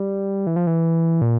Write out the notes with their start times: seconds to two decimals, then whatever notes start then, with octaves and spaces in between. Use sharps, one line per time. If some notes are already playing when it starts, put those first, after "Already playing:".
Already playing: G3
0.47 E3
0.56 F3
0.67 E3
1.22 A#2